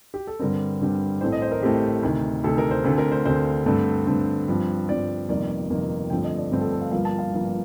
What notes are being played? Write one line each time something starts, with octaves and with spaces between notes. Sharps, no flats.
G4
A4
G2 D3 G3 C4 A#4
G2 D3 G3 C4
A1 A2 A3 C4 C5
D#5
C5
A#4
A1 A2 A3 C4 G4
D2 C3 D#3
D2 C3 D#3 A4
A#4
C5
D2 D3 A3 C4 A4
A#4
C5
D2 D3 A3 C4 C5
G2 D3 A3 C4
G2 D3 A3 C4
G2 F3 C4
G2 F3 C4 D5
G1 F2 C3 D#3 A#3 D5
G1 F2 C3 D#3 A#3
G2 D3 F3 A3 C4 G5
D#5
D5
G2 D3 F3 A3 C4 C5
A4
A4
F5
G1 G2 F3 A#3 F5
A5
F5
G1 G2 F3 A#3